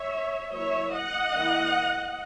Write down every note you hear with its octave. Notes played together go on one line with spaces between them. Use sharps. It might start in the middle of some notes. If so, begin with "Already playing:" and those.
Already playing: C#5 E5
F#3 A#3 E4 C#5 E5
D#5 F#5
D#3 A#3 E4